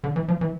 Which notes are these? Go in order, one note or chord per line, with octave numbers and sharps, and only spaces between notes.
D3
E3
F3
E3